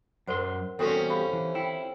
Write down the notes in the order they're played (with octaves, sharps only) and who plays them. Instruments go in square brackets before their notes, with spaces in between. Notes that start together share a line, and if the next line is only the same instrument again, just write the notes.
[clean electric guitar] F#2 C6 [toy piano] A#4 C5 F#5
[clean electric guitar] E2 G3 F#4 [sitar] C4 C#4 [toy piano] A4
[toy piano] G4 F5 B5
[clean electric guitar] E3
[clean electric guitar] E4 [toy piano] F4 G5